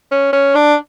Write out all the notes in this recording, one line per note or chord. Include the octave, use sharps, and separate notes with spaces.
C#4
C#4
D4